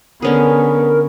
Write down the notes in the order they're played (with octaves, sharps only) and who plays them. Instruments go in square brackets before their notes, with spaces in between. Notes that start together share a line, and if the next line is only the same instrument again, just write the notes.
[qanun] D3 C#4 G#4 [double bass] B3 [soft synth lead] A#4